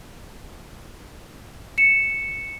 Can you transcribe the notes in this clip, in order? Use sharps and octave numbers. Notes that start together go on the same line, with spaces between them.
C#7 E7